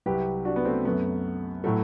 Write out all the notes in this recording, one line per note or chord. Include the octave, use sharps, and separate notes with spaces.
C2 C3 F#3 G4 B4
D4 F#4
B3
A3 C4
F#2 F#3 A3 B3
A2 F#3 A3